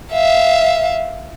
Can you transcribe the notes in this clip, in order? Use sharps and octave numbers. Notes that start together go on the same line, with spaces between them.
E5 F5